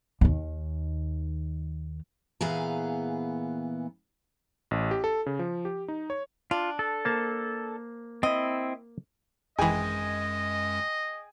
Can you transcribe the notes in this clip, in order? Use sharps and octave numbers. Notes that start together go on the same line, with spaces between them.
D#2 D#3
A#2 E3 B3 G#4 F5 A#5
A1
G4
A4
C#3
F3
G4
D#4
C#5
D4 F4
A4
A#3 C5 A5
C4 E4 D#5
G#1 F#2 E3 G#3 G#4 D#5 G5 G#5